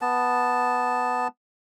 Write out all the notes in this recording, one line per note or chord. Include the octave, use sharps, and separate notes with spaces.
B3 A5